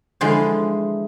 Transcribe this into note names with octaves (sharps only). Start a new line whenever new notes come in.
D3 E3 F3 G#3